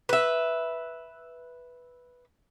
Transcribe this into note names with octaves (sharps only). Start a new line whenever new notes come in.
B4 E5